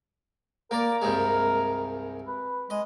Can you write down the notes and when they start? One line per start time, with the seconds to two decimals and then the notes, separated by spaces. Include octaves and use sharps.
0.71 A#3 A#4 D5
1.02 C2 G2 G#3
2.28 B4
2.70 G#3 D#5